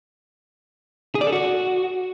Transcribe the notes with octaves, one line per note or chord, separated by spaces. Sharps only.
G#4
D5
A4
F#4